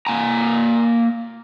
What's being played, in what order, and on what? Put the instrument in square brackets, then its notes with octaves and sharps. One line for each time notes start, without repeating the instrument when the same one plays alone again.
[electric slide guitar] A#3 G#5 A#5